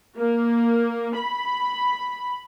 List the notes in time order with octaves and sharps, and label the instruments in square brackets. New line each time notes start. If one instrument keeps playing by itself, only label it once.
[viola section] A#3
B5